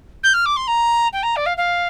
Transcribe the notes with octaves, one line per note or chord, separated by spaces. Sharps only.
G6
F6
D6
C6
A#5
G5
A#5
D5
F5
F5